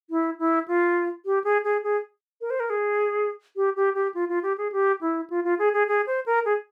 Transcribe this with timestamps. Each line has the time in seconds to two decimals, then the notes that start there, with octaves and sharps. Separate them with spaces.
0.10 E4
0.39 E4
0.68 F4
1.26 G4
1.44 G#4
1.64 G#4
1.83 G#4
2.41 A#4
2.50 C5
2.60 A#4
2.70 G#4
3.56 G4
3.76 G4
3.95 G4
4.14 F4
4.29 F4
4.43 G4
4.58 G#4
4.72 G4
5.01 E4
5.30 F4
5.44 F4
5.59 G#4
5.73 G#4
5.88 G#4
6.07 C5
6.26 A#4
6.45 G#4